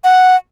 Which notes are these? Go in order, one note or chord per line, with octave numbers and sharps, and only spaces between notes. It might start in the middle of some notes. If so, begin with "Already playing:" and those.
F#5